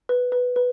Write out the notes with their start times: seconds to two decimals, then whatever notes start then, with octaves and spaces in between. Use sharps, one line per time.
0.09 B4
0.32 B4
0.56 B4